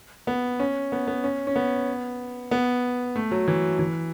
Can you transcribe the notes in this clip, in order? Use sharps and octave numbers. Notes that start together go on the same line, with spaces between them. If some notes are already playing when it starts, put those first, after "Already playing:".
B3
C#4
B3
B3
C#4
C#4
B3
B3
A3
F#3
E3
E3